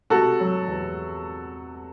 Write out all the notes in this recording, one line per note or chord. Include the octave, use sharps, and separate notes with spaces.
C3 F#4 A4
F#3
E2